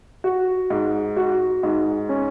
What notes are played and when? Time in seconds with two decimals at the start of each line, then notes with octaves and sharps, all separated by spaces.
0.24 F#4
0.70 G#2
1.17 F#4
1.63 G#2
2.09 C#4